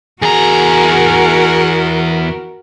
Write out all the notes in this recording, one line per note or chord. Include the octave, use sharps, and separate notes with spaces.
E2 F#4 G#4 A#4 A#5